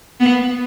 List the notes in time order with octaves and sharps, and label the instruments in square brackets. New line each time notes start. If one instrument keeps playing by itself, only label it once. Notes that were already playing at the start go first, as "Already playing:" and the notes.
[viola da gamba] B3